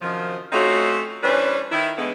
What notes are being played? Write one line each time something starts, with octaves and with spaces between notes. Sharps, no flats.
F#2 C3 D#3 F3
A3 C4 C#4 D#4 F4 F#4
E3 G3 C#4 D4 B4 C5
D#3 E4
D3 E3 G#3 A3 B3